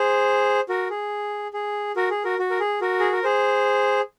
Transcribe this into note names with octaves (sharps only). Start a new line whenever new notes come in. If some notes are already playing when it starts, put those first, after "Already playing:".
Already playing: G#4 C5
F#4 A#4
G#4
G#4
F#4 A#4
G#4
F#4 A#4
F#4
A#4
G#4
F#4 A#4
G#4
A#4
G#4 C5